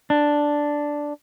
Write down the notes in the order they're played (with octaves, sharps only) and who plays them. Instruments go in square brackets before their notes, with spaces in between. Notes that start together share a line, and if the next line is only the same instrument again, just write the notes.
[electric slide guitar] D4